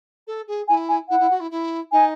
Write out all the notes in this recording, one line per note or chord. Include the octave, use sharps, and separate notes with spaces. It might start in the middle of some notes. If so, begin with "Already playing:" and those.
A4
G#4
E4 G#5
G#5
E4 F#5
E4
F#4
E4
E4
D#4 G#5